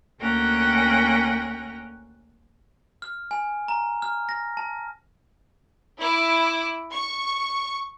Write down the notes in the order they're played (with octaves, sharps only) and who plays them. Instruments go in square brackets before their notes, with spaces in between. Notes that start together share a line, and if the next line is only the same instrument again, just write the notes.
[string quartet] D2 A#3 C#4 F#5 G5 A#6
[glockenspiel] F6
G#5
A#5
F6
A#6
A5
[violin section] E4 D6
C#6